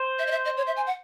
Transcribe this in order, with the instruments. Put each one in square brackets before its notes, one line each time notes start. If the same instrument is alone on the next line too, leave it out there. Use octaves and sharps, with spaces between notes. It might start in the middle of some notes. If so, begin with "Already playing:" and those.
Already playing: [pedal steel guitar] C5
[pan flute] E5
D#5
E5
D#5
C#5
E5
G#5
F#5